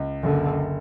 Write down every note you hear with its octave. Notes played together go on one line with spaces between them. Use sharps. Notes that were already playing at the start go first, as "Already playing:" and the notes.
Already playing: C#2
F#1 D3